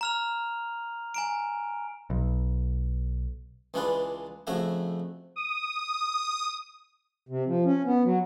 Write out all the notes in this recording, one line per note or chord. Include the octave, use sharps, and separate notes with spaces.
A#5 F6 F7
G#5 A#5 D7
B1
C#2 E3 G#3 D4 F4 B4
F2 C#3 A3 F#4 E5 F5
D#6
C3
F3
C#4
B3
F#3